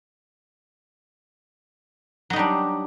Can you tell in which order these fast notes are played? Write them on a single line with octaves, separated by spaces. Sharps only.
F#3 D#4 G3 D4